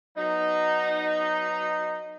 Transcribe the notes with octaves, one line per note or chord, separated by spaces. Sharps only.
F#3 B3 D#4